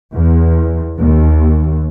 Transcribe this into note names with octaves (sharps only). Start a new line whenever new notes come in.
E2
D#2